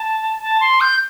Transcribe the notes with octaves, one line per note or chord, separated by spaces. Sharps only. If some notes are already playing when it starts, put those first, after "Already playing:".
Already playing: A5
A5
C6
G6